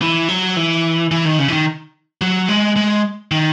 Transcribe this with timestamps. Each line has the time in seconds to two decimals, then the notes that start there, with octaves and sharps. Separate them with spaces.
0.02 E3
0.29 F#3
0.56 E3
1.11 E3
1.25 D#3
1.39 C#3
1.48 E3
1.52 D#3
2.21 F#3
2.48 G#3
2.76 G#3
3.31 D#3